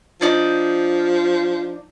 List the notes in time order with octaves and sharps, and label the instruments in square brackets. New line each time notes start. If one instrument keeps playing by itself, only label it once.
[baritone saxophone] F3 [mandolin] D4 D#4 D5